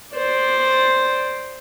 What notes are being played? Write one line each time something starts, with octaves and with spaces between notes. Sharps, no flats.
C5 D5